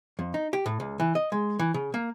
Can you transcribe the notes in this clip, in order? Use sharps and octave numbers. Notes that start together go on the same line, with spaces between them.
F2
D#4
G4
A2
C#2
E3
D#5
G#3
E3
C#3
A#3